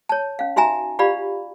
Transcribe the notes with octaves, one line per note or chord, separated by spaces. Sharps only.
C#5 A5
C#4 F5
D#4 F#4 E5 G#5 A#5
F4 G4 D5 F5 B5